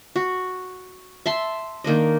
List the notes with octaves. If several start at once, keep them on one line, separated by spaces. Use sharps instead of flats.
F#4
E5 A5 C6
D#3 A#3 D4 D#5